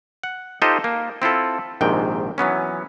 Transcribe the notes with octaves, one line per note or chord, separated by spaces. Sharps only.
F#5
D#4 F4 G4 A4 C5 D#5
A#3
C4 E4 F4 A4
A#1 G#2 C3 D#3 G5
E3 F#3 B3 C#4